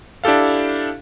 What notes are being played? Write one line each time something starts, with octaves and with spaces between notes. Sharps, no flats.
D4 E4 G4 A4 F5